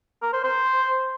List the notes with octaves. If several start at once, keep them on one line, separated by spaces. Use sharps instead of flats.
A#4
C5
C5